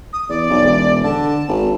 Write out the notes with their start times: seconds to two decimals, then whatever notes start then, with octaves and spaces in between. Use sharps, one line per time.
0.13 D#6
0.29 E2 D5
0.50 B1
0.62 E1
1.04 D3 A5
1.48 G#1